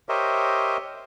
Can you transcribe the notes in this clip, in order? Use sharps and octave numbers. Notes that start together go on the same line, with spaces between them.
G4 A#4 C5 C#5 D#5 E5